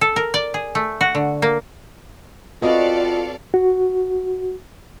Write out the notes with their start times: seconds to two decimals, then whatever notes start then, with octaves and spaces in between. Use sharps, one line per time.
0.01 A4
0.16 A#4
0.34 D5
0.54 G#4
0.75 A3
1.01 F#4
1.15 D3
1.42 A#3
2.62 C4 F4 F#4 A4 B4 D5 D#5 F5
3.54 F#4